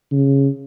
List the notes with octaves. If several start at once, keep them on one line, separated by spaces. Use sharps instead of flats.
C#3